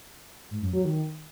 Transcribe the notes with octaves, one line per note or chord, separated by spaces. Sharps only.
G#2
F#2
F#3
D#3